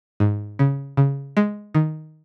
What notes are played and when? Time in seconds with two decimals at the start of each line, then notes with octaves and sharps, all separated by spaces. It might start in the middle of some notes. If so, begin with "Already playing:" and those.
0.20 G#2
0.59 C#3
0.97 C#3
1.37 G#3
1.74 D#3